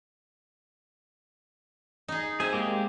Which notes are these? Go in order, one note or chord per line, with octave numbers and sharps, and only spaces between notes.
D#4 G#4
C4 G#4 C5 E5
G#3 A#3 G4